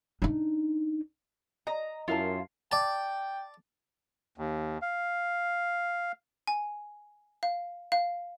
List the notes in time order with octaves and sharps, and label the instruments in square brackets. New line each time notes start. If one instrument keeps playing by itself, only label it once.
[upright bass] D4 D#4
[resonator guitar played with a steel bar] D#5 [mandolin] A#5
[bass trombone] F#2 [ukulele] E4 A#4 A5 [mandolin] F4
[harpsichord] D5 A5 [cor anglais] G5
[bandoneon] D#2
F5
[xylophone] G#5
F5
F5